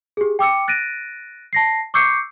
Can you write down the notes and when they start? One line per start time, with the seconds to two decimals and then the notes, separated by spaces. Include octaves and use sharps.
0.17 G4 G#4
0.39 G5 D6 E6 C#7
0.68 F#6 A6 A#6 D7 D#7
1.53 A5 A#6 C7
1.94 C#6 D6 E6 G6 C7 C#7